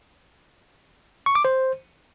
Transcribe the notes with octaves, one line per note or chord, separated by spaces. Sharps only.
C#6
D6
C5